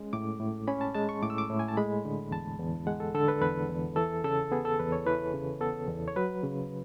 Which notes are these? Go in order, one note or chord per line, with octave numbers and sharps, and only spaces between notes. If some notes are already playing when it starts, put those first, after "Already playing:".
Already playing: G#3 C#4
A2 D6
A2
C#4 B5
A5
G#3 A5
C#6
A2 D6
E6
D6
A2
G#5
A5
G#3 B5
D3
E2 A5
E2
G#3 F#5
A4
D3 A4
B4
E2 B4
E2
E3 A4
C#3 A4
B3 G#4
A4
E2 B4
C#5
E3 B4
C#3
B3 A4
E2
C#5
F#3 B4
C#3